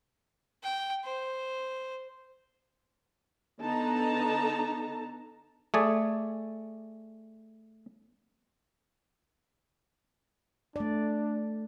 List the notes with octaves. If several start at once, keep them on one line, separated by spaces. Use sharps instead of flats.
G5
C5
D3 B3 D#4 A4 A5 A#5
A3 G#4 D5
A3 D4 D5